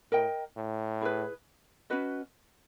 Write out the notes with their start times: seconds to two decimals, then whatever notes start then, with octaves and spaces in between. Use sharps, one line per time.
0.12 A2 A#4 D#5 G5
0.57 A2
1.01 E4 G#4 B4
1.90 C#4 F#4 B4 D#5